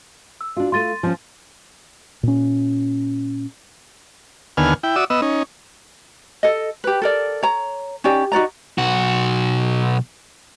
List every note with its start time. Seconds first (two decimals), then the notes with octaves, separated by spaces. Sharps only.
0.41 E6
0.57 D4 F4 F#4
0.72 A3 F4 C6 A6 D#7
1.03 F3 C#4
2.23 A#2 C#4
4.57 D#2 D3 B3 G#5 F6
4.83 E4 G5
4.96 F#4 D5 E5 D#6 E6
5.10 B3 D#5 E6
5.22 C#4 D#4
6.43 A4 D#5
6.84 G4 B4
7.02 A4 A#4 D5
7.43 C#5 A#5
8.04 C#4 D#4 G4 D5
8.32 D#4 F#4 D5 A#5
8.78 B1 F#4